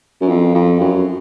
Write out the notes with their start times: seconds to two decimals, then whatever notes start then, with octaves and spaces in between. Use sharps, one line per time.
0.21 F#2
0.29 F2
0.54 F2
0.80 F#2